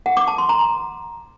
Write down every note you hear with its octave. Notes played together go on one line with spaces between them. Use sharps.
F#5
D6
A5
C6
A#5